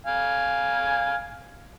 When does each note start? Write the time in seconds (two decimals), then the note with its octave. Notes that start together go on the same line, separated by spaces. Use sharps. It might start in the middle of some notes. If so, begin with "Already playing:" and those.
0.06 F5 G#5